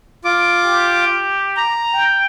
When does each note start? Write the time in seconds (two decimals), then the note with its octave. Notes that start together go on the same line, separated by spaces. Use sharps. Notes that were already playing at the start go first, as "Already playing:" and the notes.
0.25 F4 D6
0.64 G4
1.57 A#5
1.94 G5